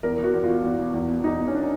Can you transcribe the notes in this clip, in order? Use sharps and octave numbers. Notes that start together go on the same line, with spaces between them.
E2 A#4
B2 F#4
E2
F4
B2
E2
B2
E2
B2
E2 D#4
B2
C#4
D4